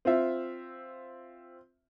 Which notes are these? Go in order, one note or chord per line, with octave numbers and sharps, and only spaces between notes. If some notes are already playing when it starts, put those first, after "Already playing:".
C4 F4 E5